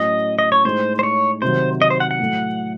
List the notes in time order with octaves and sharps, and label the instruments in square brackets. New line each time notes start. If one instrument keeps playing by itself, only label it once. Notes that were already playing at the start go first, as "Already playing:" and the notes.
Already playing: [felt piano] A2 F#3 C#4 [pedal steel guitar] D#5
[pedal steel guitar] D#5
C#5
[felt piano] A2 G#3 D#4 [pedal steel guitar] C5
[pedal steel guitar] C5
C#5
[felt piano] C3 D#3 F#3 [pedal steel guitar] C5
[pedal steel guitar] D#5
C5
F#5
F#5
[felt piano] A2 F#3 A3